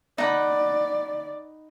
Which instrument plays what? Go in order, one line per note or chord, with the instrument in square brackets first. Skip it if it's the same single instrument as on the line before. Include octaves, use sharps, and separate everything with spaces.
[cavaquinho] D#4 F#5 B5 [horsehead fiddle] D5